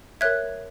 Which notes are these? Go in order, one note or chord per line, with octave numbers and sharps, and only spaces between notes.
A#4 C#5 E5 F#6 G#6